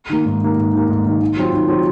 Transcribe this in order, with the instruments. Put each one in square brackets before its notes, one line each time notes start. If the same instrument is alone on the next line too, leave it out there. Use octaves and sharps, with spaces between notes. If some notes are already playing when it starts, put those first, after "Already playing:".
[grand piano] D#3 A#3
G#2
D#3 A#3
G#2
D#3 A#3
G#2
D#3 A#3
D#3
F#3 C4 F4
D#3
F#3 C4 F4